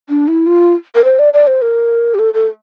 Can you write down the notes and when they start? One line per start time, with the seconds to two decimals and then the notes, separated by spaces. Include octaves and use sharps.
0.09 D4
0.28 E4
0.47 F4
0.95 A#4
1.04 C5
1.19 D5
1.34 D5
1.47 C5
1.62 A#4
2.14 G4
2.19 A4
2.34 A4